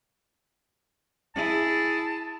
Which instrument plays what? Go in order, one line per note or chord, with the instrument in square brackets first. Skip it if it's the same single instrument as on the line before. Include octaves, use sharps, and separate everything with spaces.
[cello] E4 G#4 [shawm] A5